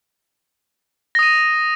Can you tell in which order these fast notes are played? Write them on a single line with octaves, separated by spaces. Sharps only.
A#6 D#6 D#7